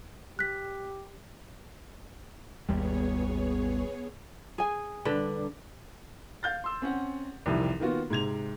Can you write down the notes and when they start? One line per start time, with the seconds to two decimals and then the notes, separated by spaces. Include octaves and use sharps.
0.39 G4 F#6 B6
2.69 G#1 D#2 G3 B3 G#4 C#5
4.58 G#4 G#5
5.05 D3 G3 D4 B4
6.43 F5 G6 A6
6.64 C6 E6
6.82 C4 C#4 F#5
7.46 C2 F2 C3 D#3 E3
7.80 D#3 A#3 B3 F4 F#4
8.10 G#2 C3 G#6 F7